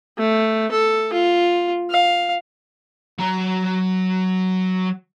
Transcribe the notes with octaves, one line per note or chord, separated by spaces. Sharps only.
A3
A4
F4
F5
F#3 A#5